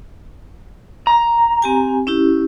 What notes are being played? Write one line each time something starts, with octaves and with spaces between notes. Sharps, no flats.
A#5
C4 G4 G#5
C#4 E4 G4